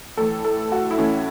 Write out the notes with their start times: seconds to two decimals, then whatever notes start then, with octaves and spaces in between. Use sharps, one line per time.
0.17 A2 E3 A4
0.45 A4
0.72 F#4
0.91 E4
0.98 A2 E3 C#4